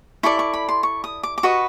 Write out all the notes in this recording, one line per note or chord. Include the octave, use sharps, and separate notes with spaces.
E4 A4 D5 C#6
C#6
B5
C6
C#6
D#6
D6
D6
F#4 B4 D#5 C#6